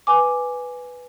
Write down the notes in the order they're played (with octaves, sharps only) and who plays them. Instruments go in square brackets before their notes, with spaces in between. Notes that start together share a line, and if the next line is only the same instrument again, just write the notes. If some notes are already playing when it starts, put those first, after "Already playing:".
[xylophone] B4 G#5 D6